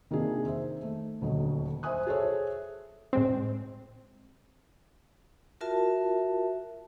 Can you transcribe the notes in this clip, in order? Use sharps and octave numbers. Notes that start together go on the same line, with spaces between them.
C3 D#3 A#3 D4 G#4
D#3 C5 E5
A3
D#1 D2 F#3 D#5
C5 E5 G#5 D#6 F#6
G#4 A4 C5 C#5 E5
A2 G#3 C4
F4 F#4 A#4 E5 A5